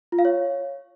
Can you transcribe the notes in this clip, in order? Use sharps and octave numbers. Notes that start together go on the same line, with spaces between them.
F4
F5
C#5